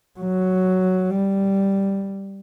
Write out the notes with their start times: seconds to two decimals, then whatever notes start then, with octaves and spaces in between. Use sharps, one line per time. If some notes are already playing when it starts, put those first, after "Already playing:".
0.20 F#3
1.11 G3